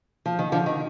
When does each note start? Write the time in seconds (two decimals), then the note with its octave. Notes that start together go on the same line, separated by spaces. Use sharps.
0.26 F3
0.39 D#3
0.52 D3 F3
0.66 D#3